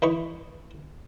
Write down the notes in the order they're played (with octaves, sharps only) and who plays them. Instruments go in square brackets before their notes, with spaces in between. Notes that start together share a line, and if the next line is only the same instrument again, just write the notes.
[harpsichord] E3 D#4 B4 C#6